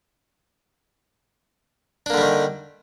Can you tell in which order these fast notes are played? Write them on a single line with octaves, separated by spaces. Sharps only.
D4 A#3 D3 G3 D#3